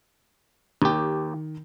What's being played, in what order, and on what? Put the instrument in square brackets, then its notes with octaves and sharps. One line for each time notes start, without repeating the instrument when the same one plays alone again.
[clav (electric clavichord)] D#2 G4 [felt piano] D#3